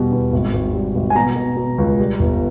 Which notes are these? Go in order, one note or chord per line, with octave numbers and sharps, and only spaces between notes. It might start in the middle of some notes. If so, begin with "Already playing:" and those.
Already playing: E2 B2 G3
E2
G#1
G#1
G3
G#1
G#5
B2 A#5
B2
B2
C#2
G3
G1